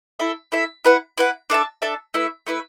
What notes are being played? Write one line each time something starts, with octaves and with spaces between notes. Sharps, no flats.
E4 A4 E5
E4 A4 E5
E4 B4 F#5
E4 B4 F#5
D4 A4 E5 A5
D4 A4 E5 A5
A3 E4 B4 E5
A3 E4 B4 E5